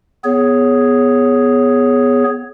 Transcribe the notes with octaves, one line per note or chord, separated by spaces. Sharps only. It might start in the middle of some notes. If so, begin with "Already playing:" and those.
B3 G#4 C#5